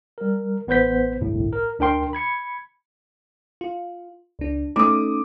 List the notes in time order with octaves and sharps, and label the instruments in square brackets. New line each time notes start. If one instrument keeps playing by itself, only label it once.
[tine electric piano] G3 A#4
A1 B3 B4 C5 G6 B6
G1 C2 A2
A#4
D2 D4 A#4 G5 C6
B5 G#6 C#7
[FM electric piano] F4
C#2 D4
[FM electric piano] A3 C#4 D#4 [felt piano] D6 D#6